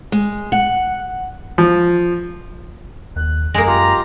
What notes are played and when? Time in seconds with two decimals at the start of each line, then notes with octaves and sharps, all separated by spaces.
0.12 G#3
0.52 F#5
1.58 F3
3.16 D#2 F#6
3.54 F#2 G#3 A#3 A#6
3.67 F4 G4 A#5